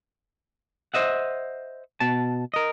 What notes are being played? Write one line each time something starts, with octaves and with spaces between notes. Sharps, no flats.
C5 D#5 E5 F#5
B2 A5
A#4 D#5